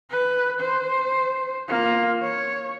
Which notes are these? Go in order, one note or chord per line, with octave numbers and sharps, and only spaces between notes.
B4
C5
A#3 F4
C#5